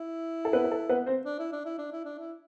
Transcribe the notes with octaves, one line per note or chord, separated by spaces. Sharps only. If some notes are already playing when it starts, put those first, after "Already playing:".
Already playing: E4
A4
B3 B4
B4
A4
B3 B4
C4 C5
D4
E4
D4
E4
D4
E4
D4
E4